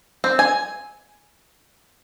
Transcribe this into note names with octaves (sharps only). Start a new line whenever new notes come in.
C4
G#5